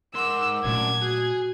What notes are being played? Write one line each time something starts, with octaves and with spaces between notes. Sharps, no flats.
G#2 A#4 F#5 C6 D6 E6
F#2 A#2 A3 D4 G#6
F#4 G#4